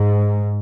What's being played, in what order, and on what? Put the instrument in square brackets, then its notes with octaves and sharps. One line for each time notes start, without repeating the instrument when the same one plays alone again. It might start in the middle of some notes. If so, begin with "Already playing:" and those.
Already playing: [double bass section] G#2